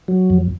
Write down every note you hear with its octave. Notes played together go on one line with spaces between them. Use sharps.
F#3
F2